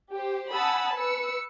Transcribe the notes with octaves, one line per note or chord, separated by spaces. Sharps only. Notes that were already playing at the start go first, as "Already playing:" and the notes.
G4 C5
F#5 G#5 A5 B5 D#6 E6
B4 E6 C#7